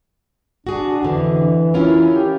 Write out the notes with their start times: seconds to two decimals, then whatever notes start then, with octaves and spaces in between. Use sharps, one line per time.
0.67 D4 F#4 G#4
1.03 F2 D3 E3
1.74 C#4 E4 F4 A#4
2.13 G4